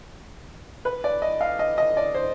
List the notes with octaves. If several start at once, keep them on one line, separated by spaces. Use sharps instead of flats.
B4
D5
D#5
F5
D#5
D#5
D5
C5